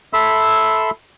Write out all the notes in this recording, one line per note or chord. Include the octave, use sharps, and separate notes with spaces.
A4 E5 B5 C6 E6